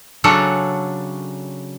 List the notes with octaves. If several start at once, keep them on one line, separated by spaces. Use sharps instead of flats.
C#3 F#3 C#4 D4 A4 F#5